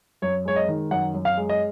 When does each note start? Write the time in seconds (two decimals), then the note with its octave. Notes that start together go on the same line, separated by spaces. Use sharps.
0.22 F#2 C#5
0.45 G#3 C#5
0.56 D#5
0.68 D#3
0.91 F#2 F#5
1.14 F#2
1.25 F5
1.37 G#3
1.49 D#5